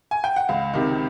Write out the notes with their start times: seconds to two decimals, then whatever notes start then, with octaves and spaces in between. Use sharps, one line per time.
0.11 G#5
0.24 G5
0.36 F#5
0.49 C#2 F5
0.74 C3 D#3